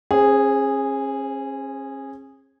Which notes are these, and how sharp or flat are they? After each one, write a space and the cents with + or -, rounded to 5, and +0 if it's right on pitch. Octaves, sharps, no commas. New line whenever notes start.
C#4 -40 G#4 -10 C5 +0